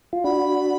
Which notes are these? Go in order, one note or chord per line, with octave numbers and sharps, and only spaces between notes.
F4
D4 F#4 B5